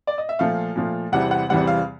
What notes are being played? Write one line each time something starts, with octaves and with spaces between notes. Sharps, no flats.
D5
D#5
E5
A#2 F3 A3 F5
A#2 F3 A3
E2 C3 E3 G3 C4 F#5
F#5
E2 C3 E3 G3 C4 F#5
F5